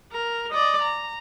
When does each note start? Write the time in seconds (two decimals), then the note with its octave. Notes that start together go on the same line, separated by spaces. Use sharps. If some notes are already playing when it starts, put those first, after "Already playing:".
0.12 A#4
0.51 D5 D#5
0.82 A#5